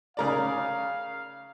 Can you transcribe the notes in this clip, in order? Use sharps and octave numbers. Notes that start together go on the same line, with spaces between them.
C#3 A#4 D5 F5